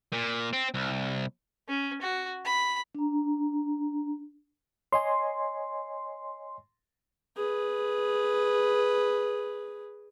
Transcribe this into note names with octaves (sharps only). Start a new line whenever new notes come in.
A#2
C4
C2
C#4
F#4
B5
D4 A#5
C#5 D#5 G#5 C6
G#4 B4